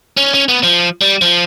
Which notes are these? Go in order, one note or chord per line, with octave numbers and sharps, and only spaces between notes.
C#4
C#4
B3
F3
G3
F3